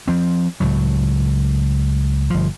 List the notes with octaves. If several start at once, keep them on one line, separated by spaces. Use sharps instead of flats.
F3 C4
C#2 A2 F#3
G1 F3